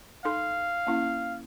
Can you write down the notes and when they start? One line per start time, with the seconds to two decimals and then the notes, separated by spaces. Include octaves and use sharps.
0.25 D#4 A4 F5 C6
0.87 A#3 C#4 E4